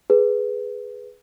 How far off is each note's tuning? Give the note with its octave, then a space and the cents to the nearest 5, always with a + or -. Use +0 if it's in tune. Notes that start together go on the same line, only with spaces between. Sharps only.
G#4 +5 B4 +0